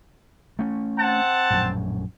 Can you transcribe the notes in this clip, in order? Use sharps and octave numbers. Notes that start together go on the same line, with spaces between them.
A3 C#4
C4 F#5 A5
A#1 F#2 A2